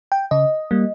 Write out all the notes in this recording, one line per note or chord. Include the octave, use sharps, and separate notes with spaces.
G5
C#3 D#5
G3 A#3